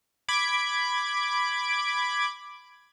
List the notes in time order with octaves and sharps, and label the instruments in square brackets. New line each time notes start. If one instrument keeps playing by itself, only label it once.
[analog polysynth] B5 D6 G#6 D7